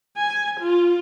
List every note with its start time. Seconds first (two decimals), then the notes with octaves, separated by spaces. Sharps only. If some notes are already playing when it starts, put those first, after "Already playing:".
0.17 G#5
0.60 F4